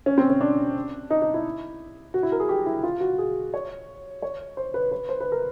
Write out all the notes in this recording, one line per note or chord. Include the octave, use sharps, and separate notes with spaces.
C#4
C4
C#4
D4
D#4
D#4
E4
F#4
E4
A#4
G#4
G4
E4
F4
F#4
G#4
C#5
C#5
C5
B4
B4
C5
B4
A#4